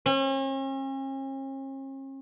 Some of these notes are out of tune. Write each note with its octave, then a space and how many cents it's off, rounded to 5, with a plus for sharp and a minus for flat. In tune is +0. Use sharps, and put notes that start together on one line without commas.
C#4 -45